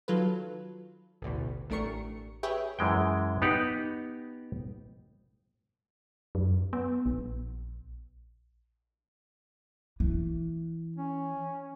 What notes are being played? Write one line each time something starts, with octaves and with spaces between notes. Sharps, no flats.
D#3 F#3 F4 A4 B4
A1 D2 B2
A1 A3 D4 A#4 C#6 C#7
G4 G#4 B4 C#5 E5 G5
F#2 E3 G#3 G5
B3 D#4 G4 F#5
F#2
B3
A#1
E3
C#4